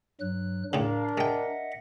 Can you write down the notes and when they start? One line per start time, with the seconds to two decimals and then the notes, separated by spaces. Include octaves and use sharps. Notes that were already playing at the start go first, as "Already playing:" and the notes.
0.21 G2 F#3 F#6
0.73 A2 C#3 D4 A#4 F5
1.18 G#3 D#5 E5 F#5 G5